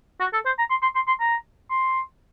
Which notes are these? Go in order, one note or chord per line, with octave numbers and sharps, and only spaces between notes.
F#4
A4
C5
A#5
C6
C6
C6
C6
A#5
C6